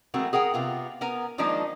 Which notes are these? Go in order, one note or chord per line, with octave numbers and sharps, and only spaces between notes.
E3 G#3 A3 C4 F#4 A#4
G#4 A#4 F#5 G5
C3 B3 F4
B3 A#4 G#5 A#5
D#3 F3 G#3 A#3 D4 D#4